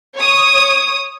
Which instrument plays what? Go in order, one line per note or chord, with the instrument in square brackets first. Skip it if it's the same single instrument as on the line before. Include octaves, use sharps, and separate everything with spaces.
[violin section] C#5 D#6